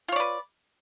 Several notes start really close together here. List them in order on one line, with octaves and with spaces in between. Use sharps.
F4 C#5 D5 B4